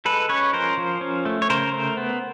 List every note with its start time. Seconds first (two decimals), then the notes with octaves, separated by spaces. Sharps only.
0.05 G#3 A4 B4
0.29 C#4 B4 C#5
0.53 F3 A#4 C5
0.78 F3
1.01 C#4
1.25 A3
1.42 C#5
1.49 C#3 A#4 C5
1.73 A3
1.97 B3